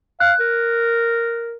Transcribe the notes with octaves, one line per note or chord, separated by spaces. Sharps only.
F5 F#6
A#4